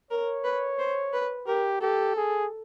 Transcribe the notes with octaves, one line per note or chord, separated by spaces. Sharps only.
A#4 C#5
B4
C5
B4
G4 A#4
G4 A4
G#4